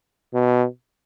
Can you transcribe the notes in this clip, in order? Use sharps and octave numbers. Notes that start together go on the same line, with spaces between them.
B2